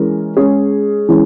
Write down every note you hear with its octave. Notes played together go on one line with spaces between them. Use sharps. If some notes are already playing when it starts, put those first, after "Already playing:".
Already playing: E3 G#3 C#4 A#4
G#3 C#4 G#4
E3 G#3 C#4